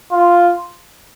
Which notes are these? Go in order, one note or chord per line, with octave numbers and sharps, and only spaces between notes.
F4